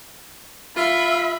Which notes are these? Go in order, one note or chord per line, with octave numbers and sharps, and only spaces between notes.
F4 E5 B5